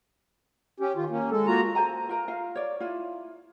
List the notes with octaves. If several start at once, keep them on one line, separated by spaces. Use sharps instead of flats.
C#4 G4
D#3 F4
A#3 C#4
G#3 A4
A#3 F4 F#4 A#5
A4 C5 G#5 A#5
F4 A#4 A#5
F4 F5
C#5 D5
E4 F4